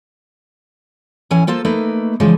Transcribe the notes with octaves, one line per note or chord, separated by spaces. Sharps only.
A2 E3 C#4 G#5
A#3 F4 A4 C5
A3 A#3 D#4 B4
C#3 E3 F3 G#3